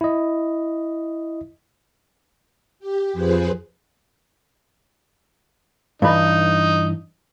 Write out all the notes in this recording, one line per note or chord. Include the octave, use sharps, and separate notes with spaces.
E4 D#5
G4
F2 F3 G#4 B4 C5
G2 E3 D#4 B5